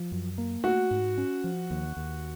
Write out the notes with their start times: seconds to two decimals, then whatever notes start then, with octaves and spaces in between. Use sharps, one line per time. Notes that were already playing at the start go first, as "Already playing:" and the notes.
Already playing: F3
0.12 F#2
0.38 A#3
0.64 A3 F#4
0.91 G#2
1.18 C#4
1.44 F3
1.70 D#2
1.97 D#2